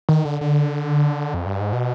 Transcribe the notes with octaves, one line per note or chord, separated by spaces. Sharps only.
D#3
D3
D3
F2
G2
G#2
B2